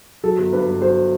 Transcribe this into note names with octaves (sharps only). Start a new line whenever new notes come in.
F#3 A4
G1
G2 B4
G2
F#3 C5